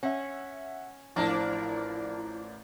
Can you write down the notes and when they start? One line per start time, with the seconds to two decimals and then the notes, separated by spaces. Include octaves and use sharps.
0.03 C#4 E5 F#5
1.16 A1 F3 A#3 D4 E4 A#4 D5